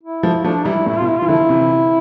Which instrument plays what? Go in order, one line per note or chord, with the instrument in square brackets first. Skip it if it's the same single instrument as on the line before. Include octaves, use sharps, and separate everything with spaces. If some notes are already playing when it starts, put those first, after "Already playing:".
[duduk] E4
[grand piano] F3 A3
[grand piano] F3 A3 [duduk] D4
[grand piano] E3 G3 [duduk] E4
[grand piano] A2 [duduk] E4
[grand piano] B2 [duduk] F4
[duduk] E4
[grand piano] E3 [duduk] F4
[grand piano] D3 F3 [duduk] E4
[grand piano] C3 E3